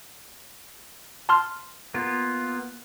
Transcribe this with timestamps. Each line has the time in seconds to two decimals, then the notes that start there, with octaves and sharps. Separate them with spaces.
1.29 A5 C6 F6
1.94 A#3 B3 F4